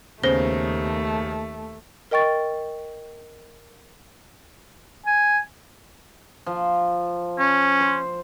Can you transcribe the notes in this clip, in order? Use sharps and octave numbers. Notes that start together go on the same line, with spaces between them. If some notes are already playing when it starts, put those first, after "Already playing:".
D#2 C#3 A3 B3 C#4 C5 A#6 G7
A#4 D#5 G5 C#6 A6
G#5
F3
C#4
C5